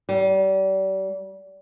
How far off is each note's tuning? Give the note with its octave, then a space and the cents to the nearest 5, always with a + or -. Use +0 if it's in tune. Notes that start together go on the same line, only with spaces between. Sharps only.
G3 -35